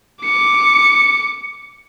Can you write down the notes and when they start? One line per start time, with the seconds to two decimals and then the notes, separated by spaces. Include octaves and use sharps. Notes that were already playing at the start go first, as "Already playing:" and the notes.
0.24 D6 C#7